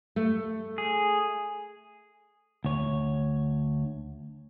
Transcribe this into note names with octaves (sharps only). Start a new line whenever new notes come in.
A3
G#4
D2 C#5